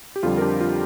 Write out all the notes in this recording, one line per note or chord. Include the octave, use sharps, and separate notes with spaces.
G4
F2 D3 G3 F4
A#4
D4 G4
F4